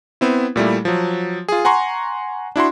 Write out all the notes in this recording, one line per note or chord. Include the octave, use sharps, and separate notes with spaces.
B3 C4 E4
A#2 G3 A3 E4
F3 F#3
F4 G#4
F#5 G#5 A#5 C6 C#6
D4 E4 F#4 C6